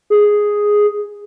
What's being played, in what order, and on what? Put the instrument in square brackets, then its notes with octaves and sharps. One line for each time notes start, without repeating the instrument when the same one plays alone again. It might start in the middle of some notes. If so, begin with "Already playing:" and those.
[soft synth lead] G#4